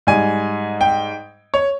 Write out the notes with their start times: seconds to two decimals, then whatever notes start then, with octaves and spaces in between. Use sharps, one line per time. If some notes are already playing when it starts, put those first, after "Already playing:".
0.07 G#2 G3 G#5
0.81 G5
1.54 C#5